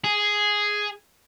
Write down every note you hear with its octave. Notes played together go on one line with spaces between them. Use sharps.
G#4